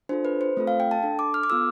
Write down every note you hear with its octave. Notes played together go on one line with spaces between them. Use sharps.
D4 F4 A4 C5
B4
C5
A3 C4 F4 A4
F5
G5
A5
D4 A4
D6
F6
D6
B3 F4 A4 E6